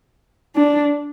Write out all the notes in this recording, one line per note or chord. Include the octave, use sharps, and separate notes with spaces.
D4